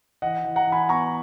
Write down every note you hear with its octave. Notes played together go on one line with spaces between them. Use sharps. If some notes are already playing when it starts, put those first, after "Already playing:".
E3 D#5 F#5
E3
F#5 A#5
E3
G#5 B5
B3 A#5 C#6